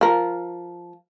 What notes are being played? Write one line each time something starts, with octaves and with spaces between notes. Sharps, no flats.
F3 A#4